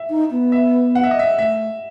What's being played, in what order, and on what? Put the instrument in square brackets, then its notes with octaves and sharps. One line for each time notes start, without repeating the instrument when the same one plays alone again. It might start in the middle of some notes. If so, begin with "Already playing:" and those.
Already playing: [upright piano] E5
[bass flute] D#4
B3
[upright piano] E5
F#5
E5
D#5
E5
[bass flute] A3 [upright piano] E5